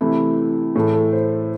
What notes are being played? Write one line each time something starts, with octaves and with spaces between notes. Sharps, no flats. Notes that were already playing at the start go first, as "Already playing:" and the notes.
C3 E3 A3 E4
A2 E3 A3 G#4
A4
C5